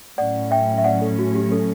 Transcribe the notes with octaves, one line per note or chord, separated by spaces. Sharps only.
A2 F#3 C#4 D5 F#5
E5 G5
E5
D5 F#5
A4
F#4
G4
A4